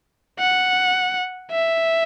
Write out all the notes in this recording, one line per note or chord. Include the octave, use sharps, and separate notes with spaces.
F#5
E5